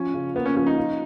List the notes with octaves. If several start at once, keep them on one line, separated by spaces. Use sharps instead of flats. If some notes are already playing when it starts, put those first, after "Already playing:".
Already playing: F3 C#4
C#3
A#3 B3
C#4
F3 C#4
D#4
F4